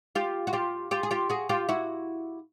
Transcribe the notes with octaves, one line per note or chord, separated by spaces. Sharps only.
F4 G4
F#4
F4 G4
F4 G4
G#4
F4 G4
F#4 G#4
F4 G4
E4 F#4